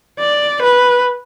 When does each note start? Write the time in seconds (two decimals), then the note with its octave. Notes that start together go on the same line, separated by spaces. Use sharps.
0.20 D5
0.63 B4